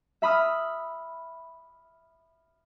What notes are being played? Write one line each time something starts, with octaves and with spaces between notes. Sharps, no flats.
E5 B5 D#6 F6